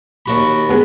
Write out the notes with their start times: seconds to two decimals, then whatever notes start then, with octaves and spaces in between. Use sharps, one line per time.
0.26 D#2 F#4 B5
0.70 G#3 B3